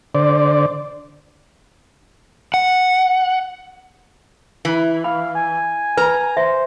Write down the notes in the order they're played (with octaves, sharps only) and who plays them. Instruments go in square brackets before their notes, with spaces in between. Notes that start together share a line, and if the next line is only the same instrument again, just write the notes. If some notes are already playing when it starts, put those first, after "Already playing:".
[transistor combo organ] D3 C5 D5
[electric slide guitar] F#5
[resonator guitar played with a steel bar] E3 [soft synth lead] E4
[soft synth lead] F5 [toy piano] B5
[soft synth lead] G#5
[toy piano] B4 [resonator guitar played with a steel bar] A#5
[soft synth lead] C5 [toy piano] E5